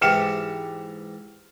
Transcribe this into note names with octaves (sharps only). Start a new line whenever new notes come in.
G#2 E3 G4 F6 C#7 E7